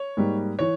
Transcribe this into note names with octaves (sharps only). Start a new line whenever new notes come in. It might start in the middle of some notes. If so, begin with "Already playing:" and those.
Already playing: C#5
G#2 G3 A#3
E3 C#5